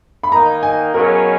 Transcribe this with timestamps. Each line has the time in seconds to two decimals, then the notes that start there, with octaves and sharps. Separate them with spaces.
0.23 B5
0.32 D#3 A#3 D#4 A#5
0.63 G#5
0.94 B2 F#3 A#3 C#4 G#4 A#4